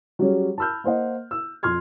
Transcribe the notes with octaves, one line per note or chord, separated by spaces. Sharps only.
F#3 G3 C#4 G#4
A5 B5 E6 F6 G6
A#3 C5 D#5 F#5
E6
F2 C6 F6 G#6